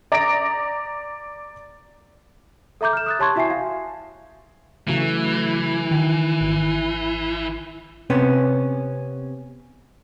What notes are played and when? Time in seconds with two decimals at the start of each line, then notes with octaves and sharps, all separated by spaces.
0.12 D5 A#5 D#6 A#6 D7
2.81 A4 E5 A#5 D6 G6
2.93 F6 E7
3.06 D#6 F#6 A6
3.19 G4 C#5 A5 C6 C#6 G#6
3.36 E4 F#4 E5 G5 G#5 C7
3.50 F5
4.88 C#3 E3 F#3 A3
5.91 D#3
6.41 G#1
8.10 C3 B3 C#4